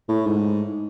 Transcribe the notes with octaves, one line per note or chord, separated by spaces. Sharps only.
A2
G#2